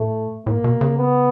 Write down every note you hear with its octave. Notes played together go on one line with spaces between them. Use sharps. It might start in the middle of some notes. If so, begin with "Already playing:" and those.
Already playing: A2 A3
A2 A#3
B2
C#3
B3